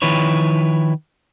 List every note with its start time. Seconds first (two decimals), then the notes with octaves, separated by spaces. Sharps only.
0.02 D#3 F3 E4 B4 C#5